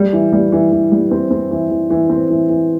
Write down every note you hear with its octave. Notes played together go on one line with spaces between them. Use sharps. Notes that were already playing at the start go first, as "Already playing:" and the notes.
Already playing: G3
E3
G3
E3
E3
G3
C4
C4
E3
E3
E3
C4
E3
E3